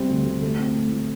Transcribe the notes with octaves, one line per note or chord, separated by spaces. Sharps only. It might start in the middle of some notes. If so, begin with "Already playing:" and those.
Already playing: C3 G3 C4
D2
D2
A3
C4
A2
A2